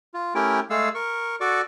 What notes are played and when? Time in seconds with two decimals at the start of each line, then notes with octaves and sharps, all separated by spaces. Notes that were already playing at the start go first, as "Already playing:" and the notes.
0.14 F4
0.35 A3 C#4 E4 G4 A#4 G5
0.70 G#3 A3 G#4 A4 F5 E6
0.95 A#4 C#6
1.41 F#4 A4 D5 C#6 D6